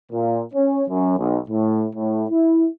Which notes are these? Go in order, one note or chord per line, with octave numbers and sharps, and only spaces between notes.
A#2
C#4
F#2
B1
A2
A2
E4